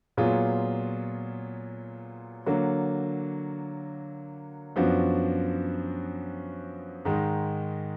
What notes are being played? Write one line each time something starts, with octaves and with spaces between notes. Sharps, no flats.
A#2 F#3 B3 F4 G#4
D3 F#3 A#3
F#2 F3 B3 D4 F#4
G#2 D#3 G#3